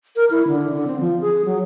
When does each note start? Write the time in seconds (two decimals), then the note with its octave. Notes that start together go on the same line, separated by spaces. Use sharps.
0.16 A#4
0.31 E4
0.47 D3
0.71 D3
0.87 C4
1.00 F3
1.21 G#4
1.45 F#3